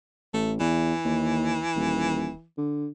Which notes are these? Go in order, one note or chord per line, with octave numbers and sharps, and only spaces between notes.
A1 A3
E2 E3
D#2
D#1
D3